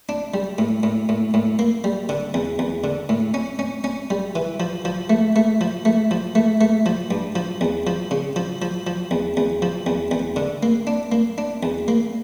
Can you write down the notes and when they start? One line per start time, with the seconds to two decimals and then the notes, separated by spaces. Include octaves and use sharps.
0.09 D4
0.34 G3
0.58 A2
0.83 A2
1.09 A2
1.34 A2
1.59 A#3
1.84 G3
2.09 D3
2.34 E2
2.59 E2
2.84 D3
3.09 A2
3.34 C#4
3.59 C#4
3.84 C#4
4.10 G3
4.36 E3
4.60 F3
4.85 F3
5.10 A3
5.36 A3
5.61 F3
5.85 A3
6.11 F3
6.35 A3
6.61 A3
6.86 F3
7.11 G2
7.36 F3
7.61 E2
7.87 F3
8.11 C#3
8.36 F3
8.62 F3
8.87 F3
9.11 E2
9.37 E2
9.62 F3
9.86 E2
10.11 E2
10.36 D3
10.63 A#3
10.87 D4
11.12 A#3
11.38 D4
11.63 E2
11.88 A#3